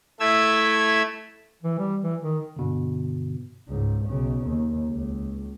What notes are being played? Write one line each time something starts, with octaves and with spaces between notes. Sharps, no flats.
A3 E4 E6 G#6
E3
G3
E3
D#3
G2 B2 D3
C#2 G#2
B1 C#3
D#2
C#2